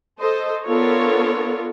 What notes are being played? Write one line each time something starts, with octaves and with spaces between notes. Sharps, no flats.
A4 C5 D#5
B3 D4 F4 A4 A#4 C#5